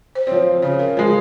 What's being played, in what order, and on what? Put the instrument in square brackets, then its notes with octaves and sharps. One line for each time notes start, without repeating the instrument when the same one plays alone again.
[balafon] C5
[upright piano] F3 C4 [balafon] C#5
[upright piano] C#3 [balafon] C#5
[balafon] A#4
[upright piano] F3 G#3 [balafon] A#4